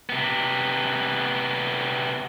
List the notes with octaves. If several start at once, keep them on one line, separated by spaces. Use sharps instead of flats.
C3 B3